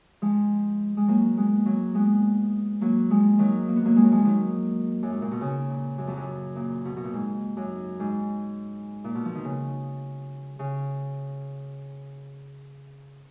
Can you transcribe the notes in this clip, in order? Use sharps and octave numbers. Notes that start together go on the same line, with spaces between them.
F3 G#3
G#3
F#3 A#3
G#3 B3
F#3 A#3
G#3 B3
F#3 A#3
F3 G#3
D#3 F#3
A#3
B3
F#3 A#3
G#3
F#3
F3 G#3
D#3 F#3
F#2
G#2
A#2
B2
C#3
A#2
F#2
F2
F#2
A#2
B2
B2
A#2
G#2
F#2
G#2
A#2
B2
F3
D#3
C#3
C#3